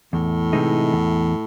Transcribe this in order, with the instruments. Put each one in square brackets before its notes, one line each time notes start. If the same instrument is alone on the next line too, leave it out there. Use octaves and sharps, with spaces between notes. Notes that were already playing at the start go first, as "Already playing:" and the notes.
[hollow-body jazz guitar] E2 [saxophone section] A2
[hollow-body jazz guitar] C3 E3 G#3 D#4
E2